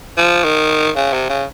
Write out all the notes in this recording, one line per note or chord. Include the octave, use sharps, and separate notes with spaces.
F3
D#3
C#3
C3
C#3